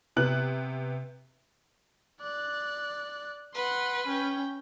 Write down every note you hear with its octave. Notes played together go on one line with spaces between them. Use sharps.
C3 B3 F#6 F#7
D5 F#6
B4 F#5 C6
C#4 G5